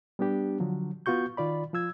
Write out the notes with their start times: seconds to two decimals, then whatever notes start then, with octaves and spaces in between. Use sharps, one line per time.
0.19 G3 B3 D4 G4
0.60 D3 F3 F#3
1.06 B3 F4 F#4 C#6 G6
1.37 D#3 F4 D5 B5
1.73 F3 F4 E6 G#6